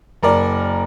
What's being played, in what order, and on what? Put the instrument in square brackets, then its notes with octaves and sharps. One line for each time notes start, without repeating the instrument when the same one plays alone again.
[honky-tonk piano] F#1 A#4 D5